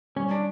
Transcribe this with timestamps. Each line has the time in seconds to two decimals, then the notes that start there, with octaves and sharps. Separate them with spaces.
0.16 G3 C#4
0.31 D4